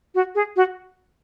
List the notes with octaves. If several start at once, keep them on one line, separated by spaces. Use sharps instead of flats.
F#4
G#4
F#4